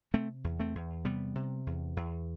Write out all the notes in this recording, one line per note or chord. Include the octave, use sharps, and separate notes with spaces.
C3 A3 C4
E2
A3 C4
E2
C3 G3 B3
C3
E2
E2